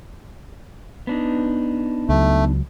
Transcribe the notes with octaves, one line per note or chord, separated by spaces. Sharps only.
B3 D4 D#4
C#2 F#3 A3